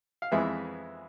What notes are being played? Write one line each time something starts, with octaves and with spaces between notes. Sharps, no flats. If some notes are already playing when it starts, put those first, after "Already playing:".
F5
F2 E3 G#3 B3 E5